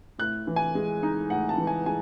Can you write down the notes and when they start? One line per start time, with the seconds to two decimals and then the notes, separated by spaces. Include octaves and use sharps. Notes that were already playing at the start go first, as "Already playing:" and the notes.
0.18 A2 F#6
0.47 E3
0.56 G#5
0.75 G#3
1.03 D#4
1.30 A2 F#5
1.49 A5
1.58 E3
1.67 G#5
1.86 G#3 G#5